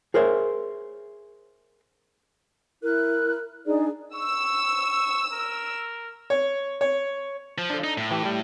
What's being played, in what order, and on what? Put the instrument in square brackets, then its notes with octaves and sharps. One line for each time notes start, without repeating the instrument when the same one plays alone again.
[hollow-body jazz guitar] G#4 A#4 C5 C#5 E5
[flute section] E4 F#6 [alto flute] A#4
[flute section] D4 G#4 D5 [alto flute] D#4
[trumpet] C#6 [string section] E6
[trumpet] A#4
[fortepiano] C#5
C#5
[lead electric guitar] F3
[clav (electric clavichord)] D4 A4
[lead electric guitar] D#4
A2
[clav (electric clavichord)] E3 G4
G3